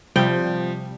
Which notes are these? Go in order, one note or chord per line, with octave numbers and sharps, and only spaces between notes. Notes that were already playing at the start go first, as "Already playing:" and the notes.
C3 F3 G3 G5